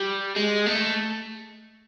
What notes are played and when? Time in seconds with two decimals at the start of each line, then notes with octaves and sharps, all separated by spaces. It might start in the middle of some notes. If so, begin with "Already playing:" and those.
Already playing: G3
0.36 G#3
0.66 A3